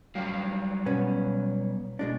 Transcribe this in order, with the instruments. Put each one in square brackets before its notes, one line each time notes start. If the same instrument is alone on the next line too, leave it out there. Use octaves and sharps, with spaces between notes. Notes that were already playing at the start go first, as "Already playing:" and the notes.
[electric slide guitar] F#3 G3 F5
[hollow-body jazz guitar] B2 B3 C#4
B2 G#3 D4